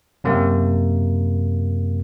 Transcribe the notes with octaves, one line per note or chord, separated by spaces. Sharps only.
F#2 C3 A#3